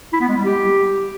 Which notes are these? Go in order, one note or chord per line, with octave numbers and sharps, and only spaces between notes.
E4
B3
G#3
G3
G4